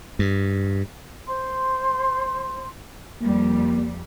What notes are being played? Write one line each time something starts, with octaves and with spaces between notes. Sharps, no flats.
G2
C5 C6
F2 G3 A#3